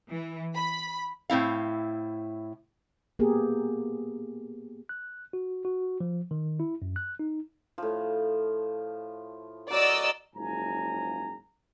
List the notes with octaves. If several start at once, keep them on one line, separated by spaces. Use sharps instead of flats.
E3
B5
A2 C4 E4 F5
A#3 B3 G4 G#4 A#4
F#6
F#4
F#4
F3
D#3
E4
F#2
F#6
D#4
A2 F3
F#3 A#4 D5 D#5 E6
F#1 G#2 C#3 F3 G#5 A#5